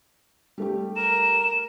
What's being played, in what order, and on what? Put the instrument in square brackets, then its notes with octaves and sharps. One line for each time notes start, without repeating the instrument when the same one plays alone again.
[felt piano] G3 A3 G4
[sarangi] A#4 [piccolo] E7